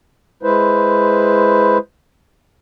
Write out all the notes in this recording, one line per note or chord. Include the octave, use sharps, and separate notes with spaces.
G#3 E4 B4 C5